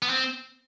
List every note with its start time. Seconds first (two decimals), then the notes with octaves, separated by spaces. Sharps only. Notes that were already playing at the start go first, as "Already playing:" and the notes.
0.02 B3
0.09 C4